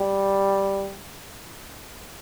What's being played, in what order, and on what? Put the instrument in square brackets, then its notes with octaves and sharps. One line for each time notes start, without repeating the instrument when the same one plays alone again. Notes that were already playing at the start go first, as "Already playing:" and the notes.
Already playing: [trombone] G3